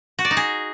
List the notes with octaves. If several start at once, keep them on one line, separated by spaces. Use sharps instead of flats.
F#4
D5
D#4
G#4